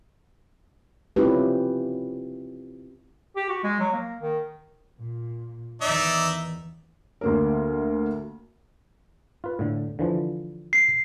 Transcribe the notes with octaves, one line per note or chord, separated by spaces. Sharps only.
C4 C#4 E4 F4 G4 B4
G4
F#4
G#3
F#3
A#3
D#3
A#2
E2 D#3 E3 D#4 D5 E5
D2 A#3 A#4
F4 B4
A2 D3
D3 E3 F3
C7